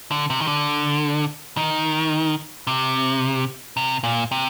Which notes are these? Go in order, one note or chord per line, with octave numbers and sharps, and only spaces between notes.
D3
C3
D#3
D3
D#3
C3
C3
A#2
C3